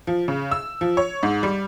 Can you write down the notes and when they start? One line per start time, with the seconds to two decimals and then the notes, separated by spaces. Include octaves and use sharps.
0.07 F3
0.28 C#3
0.51 E6
0.81 F3
0.97 C#5
1.23 G#2
1.43 G3